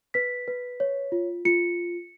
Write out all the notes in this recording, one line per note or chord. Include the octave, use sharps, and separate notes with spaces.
B4 B6
B4
C#5
F4
F4 C#7